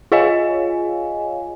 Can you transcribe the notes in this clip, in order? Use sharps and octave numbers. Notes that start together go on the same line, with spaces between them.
F4 G#4 C#5 D#5 F5 G#5